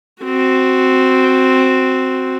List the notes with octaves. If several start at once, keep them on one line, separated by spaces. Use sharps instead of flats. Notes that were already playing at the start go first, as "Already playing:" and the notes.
C4 F#4